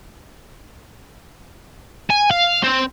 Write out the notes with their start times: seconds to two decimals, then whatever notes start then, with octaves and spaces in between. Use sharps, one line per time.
2.10 G#5
2.31 F5
2.63 C4